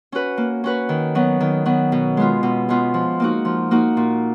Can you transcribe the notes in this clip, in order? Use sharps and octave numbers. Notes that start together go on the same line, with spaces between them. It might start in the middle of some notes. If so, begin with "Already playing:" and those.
C#4 F#4 B4
A#3
C#4 F#4 B4
D#3
F#3 B3
D#3
F#3 B3
B2
G#3 B3 F4
B2
G#3 B3 F4
F3
A#3 D#4 F#4
F3
A#3 D#4 F#4
A#2